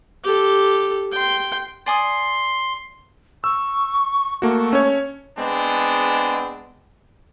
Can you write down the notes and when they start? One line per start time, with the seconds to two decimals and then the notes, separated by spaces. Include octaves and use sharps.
0.24 G4 A4
1.12 G5 C6
1.86 D5 G#5 C6 D#6
3.44 C#6 E6
4.42 A3 A#3 F#4
4.73 C#4 C#5
5.37 G#3 B3 C4 D4